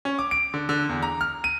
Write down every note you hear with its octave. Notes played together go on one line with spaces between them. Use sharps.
C#4
D6
D7
D3
D3
E2
A#5
F6
D#7